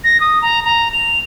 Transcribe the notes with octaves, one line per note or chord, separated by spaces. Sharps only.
A#6
D#6
A#5
A#5
F7